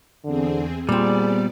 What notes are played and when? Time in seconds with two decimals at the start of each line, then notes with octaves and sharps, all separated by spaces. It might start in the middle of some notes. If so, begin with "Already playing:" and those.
0.25 E2 D3 C4 G#4
0.89 A#2 G3 B3 C4 G#4 D5